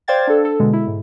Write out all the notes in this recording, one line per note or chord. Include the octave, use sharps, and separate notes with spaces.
C5 D5 F5 G5 G#6 A6
D4 A4
A4
B2 D3 G#3
E4
G#2